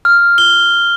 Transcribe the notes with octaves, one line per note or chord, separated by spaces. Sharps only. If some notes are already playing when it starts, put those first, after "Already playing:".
F6
G7